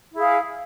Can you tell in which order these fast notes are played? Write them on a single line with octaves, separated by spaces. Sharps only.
E4 G#4 F5